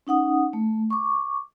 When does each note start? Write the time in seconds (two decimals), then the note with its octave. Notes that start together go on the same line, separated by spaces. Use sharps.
0.07 C#4 D#4 F#5 D#6
0.53 A3
0.90 C#6 D6